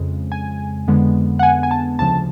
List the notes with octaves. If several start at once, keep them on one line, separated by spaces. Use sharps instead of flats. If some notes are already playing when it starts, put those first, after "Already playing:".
Already playing: F2 C#3 G#3
G#5
F2 D3 G#3 B3
F#5
G#5
G#5
A5
D2 C#3 F3 A5